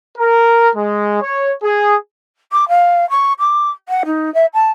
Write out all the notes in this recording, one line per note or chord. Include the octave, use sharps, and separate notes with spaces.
A#4
G#3
C#5
G#4
D6
F5
C#6
D6
F#5
D#4
E5
A5